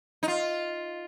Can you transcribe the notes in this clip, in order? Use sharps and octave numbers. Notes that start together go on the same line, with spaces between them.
D#4
F4